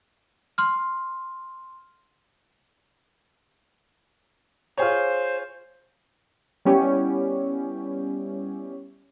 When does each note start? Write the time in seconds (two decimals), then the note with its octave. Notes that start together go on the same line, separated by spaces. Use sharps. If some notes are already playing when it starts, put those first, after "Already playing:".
0.58 C6 F6
4.78 F4 G#4 C5 C#5
6.65 G3 B3 C#4 E4 G4